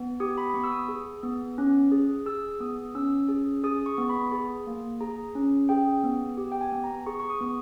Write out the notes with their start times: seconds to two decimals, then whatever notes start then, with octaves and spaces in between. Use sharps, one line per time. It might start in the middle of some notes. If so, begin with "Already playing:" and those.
Already playing: B3
0.20 G4 D#6
0.38 B5
0.50 B5
0.54 B3 C#6
0.64 E6
0.71 D#6
0.89 G#4
1.23 B3
1.58 C#4
1.92 G#4
2.26 G#4 E6
2.60 B3 D#6
2.95 C#4 E6
3.28 G#4
3.63 G#4 D#6
3.86 C#6
3.98 B3
4.09 B5
4.32 G#4
4.67 A#3
5.00 G#4 A#5
5.35 C#4
5.69 G#4 G5
6.04 B3
6.37 G4
6.52 G5
6.61 G#5
6.72 B3
6.84 A#5
7.06 G#4 C#6
7.20 C#6
7.30 D#6
7.41 B3